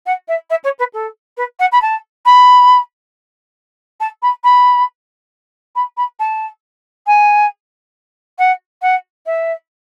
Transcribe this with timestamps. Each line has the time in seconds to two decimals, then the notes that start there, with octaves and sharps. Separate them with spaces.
0.06 F#5
0.28 E5
0.50 E5
0.64 C#5
0.79 B4
0.93 A4
1.37 B4
1.59 F#5
1.72 B5
1.82 A5
2.25 B5
4.00 A5
4.22 B5
4.44 B5
5.75 B5
5.97 B5
6.19 A5
7.06 G#5
8.38 F#5
8.82 F#5
9.26 E5